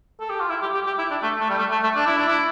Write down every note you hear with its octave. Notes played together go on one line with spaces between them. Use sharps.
A4
G4
F4
E4
G4
G4
G4
E4
D4
A3
A3
G3
A3
A3
A3
D4
E4
D4
E4